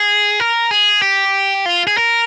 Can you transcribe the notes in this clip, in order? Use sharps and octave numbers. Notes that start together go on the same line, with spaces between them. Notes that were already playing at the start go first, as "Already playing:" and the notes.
Already playing: G#4
A#4
G#4
G4
F4
G#4
A#4